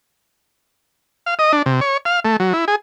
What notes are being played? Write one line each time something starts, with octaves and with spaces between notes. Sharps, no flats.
F5
D#5
D4
C3
C#5
F5
A3
F#3
E4
G#4